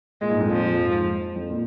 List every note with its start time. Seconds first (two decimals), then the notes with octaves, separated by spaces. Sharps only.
0.21 A#2 G#3
0.31 G#2
0.39 F2 A#2
0.51 F3
0.79 G#2
1.36 F2
1.50 A#2